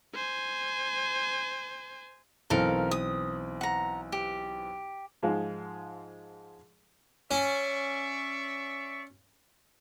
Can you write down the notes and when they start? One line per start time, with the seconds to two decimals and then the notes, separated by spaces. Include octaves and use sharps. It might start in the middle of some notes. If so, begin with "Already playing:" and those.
0.14 C5 G#5
2.50 B1 E3 C4 A4 A#4 F5
2.91 D#6
3.61 F#5 A#5
4.12 G4
5.23 G#2 F3 G#3 F4
7.31 C#4 D5 E5 C#6